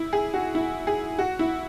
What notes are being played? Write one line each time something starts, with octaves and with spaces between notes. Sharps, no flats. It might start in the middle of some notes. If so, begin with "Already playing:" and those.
Already playing: E4
G#4
F#4
E4
G#4
F#4
E4